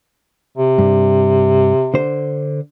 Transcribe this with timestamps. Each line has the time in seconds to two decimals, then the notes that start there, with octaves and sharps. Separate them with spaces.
0.58 C3
0.78 G2
1.94 D3 C5